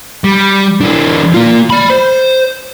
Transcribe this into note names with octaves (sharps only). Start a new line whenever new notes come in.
G3
E3 D4
A#3 F4
D5 B5
C5